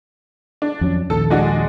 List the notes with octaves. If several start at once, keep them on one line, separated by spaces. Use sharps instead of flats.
D4
F2 F#3 C#4
A#1 D#2 A4
G#3 D4 F#4